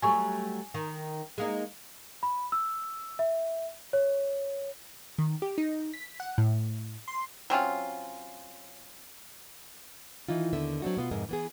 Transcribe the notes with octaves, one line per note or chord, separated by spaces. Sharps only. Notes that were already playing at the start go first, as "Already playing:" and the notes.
F#3 G3 A3 G#5 C#6
D#3
G#3 A#3 D#4
B5
E6
E5
C#5
D#3
G4
D#4
B6
F#5
A2
C6
F#3 C4 C#4 F4
D#3 E3 D#4 F4
D#2 D3 B3 E5
F#3 C4 D4 F#4
B2 B3 F4
F2 G#2 C3 G#4 A#4
E3 B3 G#4